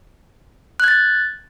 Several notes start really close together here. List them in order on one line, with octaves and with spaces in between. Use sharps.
F#6 G#6 A6